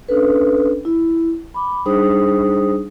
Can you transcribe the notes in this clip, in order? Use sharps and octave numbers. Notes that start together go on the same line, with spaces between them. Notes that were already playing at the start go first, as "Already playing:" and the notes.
C#4 D4 A4 B4
E4
B5 D6
G3 D4 D#4 G#4 C5 D#6